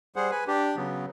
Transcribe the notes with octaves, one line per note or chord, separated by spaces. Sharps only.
G3 G#4 C5 F#5
B4 G#5
D4 G4
C#3 F#3 B3